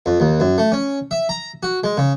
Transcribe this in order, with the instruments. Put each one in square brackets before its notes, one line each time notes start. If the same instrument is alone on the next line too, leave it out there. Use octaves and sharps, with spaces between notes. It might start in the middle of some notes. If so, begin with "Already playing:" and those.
[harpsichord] F2
D#2
F#2
A3
C#4
E5
A#5
F#4
G#3
C#3